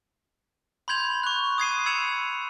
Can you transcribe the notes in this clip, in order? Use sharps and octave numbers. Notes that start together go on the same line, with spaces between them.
B5 C6 G6 G#6 F7
C#6 F#6
D#6 G#6 C7 D#7
B5 E6 G#6 C#7 E7 F7